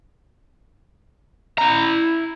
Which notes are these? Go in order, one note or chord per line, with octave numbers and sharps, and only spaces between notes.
E4 A#5